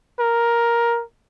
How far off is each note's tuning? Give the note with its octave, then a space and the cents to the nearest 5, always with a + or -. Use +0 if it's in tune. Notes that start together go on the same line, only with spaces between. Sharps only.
A#4 +10